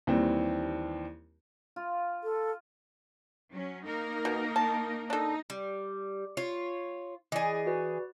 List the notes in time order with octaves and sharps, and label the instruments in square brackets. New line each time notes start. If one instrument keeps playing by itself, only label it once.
[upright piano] D#2 E3 G3 C4
[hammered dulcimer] F4
[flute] A4
[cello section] F#3 C#4
A#3 D#4 A#4
[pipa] B2
A5
[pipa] D4 A4 [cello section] D#4
[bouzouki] G3
F4 C#5
[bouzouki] E3 G#4 [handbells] D5 D#5
[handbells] F#4 B4 D5